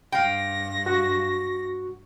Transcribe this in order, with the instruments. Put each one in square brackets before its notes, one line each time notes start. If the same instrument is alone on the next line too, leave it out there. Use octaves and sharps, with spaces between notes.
[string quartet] G2 A#6 [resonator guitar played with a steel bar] F5 G5
[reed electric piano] F#4 C#6